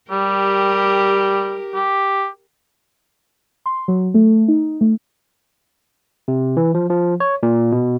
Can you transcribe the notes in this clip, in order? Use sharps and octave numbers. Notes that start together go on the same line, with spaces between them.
G3 G4 A#4
G4
C6
F#3
A3
D#4
A3
C3
E3
F3
F3
C#5
A#2
B2